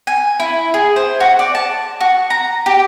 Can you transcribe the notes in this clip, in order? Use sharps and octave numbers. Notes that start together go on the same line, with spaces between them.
G#5
E4
G#4
C5
F#4
D5
A5
F#4
A#5
G4